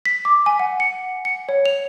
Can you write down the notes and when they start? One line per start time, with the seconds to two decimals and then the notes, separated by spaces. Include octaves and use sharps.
0.06 B6
0.25 D6
0.46 G#5
0.59 F#5
0.80 C#7
1.25 C#7
1.49 C#5
1.66 F7